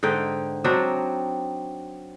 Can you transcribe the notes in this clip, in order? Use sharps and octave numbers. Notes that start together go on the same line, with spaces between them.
G#2 D3 D#4 G5
F#3 C4 D4 D#4